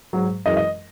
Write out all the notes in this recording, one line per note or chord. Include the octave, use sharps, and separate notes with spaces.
G#2 F#3
F#2 E3 G#3 D#5
D#5